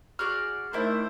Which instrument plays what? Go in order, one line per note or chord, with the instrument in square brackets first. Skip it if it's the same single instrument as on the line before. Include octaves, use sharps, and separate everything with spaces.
[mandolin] F#4 G#4 D5 [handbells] F6
[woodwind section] D#3 A3 [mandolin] D4 E4 [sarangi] C5